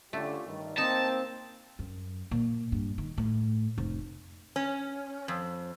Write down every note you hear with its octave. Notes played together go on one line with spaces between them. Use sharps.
D3 A3 C#4 F4 G4
G2 D#3
A#3 C4 D#4 A5
F#2
A#2
G2
D#3
A2
F1
C#4
F2